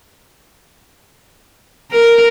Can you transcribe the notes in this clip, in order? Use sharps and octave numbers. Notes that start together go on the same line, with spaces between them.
A#4